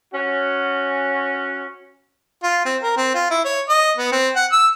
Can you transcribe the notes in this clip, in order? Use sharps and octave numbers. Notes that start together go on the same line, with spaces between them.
C#4 F#4
F4
C4
A#4
C4
F4
E4
C#5
D#5
B3
C4
F#5
E6